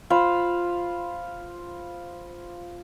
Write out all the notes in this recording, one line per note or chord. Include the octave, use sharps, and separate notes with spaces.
F4 C5 F5 B5